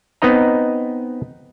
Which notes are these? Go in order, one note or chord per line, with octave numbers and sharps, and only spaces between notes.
B3 C4 D#4 D#5 A#5